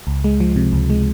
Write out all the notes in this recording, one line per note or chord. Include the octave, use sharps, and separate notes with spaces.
C#2
G#3
F3
C3
C#2
G#3